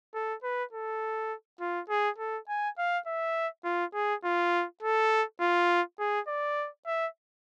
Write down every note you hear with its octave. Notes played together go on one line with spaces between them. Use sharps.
A4
B4
A4
F4
G#4
A4
G#5
F5
E5
F4
G#4
F4
A4
F4
G#4
D5
E5